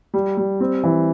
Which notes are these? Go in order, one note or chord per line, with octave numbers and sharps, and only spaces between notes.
G3
G3
C4
E3